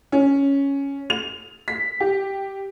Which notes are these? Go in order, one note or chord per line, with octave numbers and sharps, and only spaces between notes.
C#4
F7
B6
G4